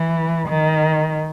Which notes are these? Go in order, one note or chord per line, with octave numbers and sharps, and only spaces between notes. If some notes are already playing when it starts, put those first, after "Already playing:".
Already playing: E3
D#3